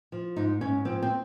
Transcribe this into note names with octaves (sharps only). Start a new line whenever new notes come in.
F3
G#2 D#4
G#2 C#4
F3 C4
C4